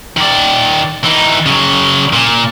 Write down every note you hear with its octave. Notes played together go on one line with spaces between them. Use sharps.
D#3 D5
E3 D#4
C#3 F#3
A#2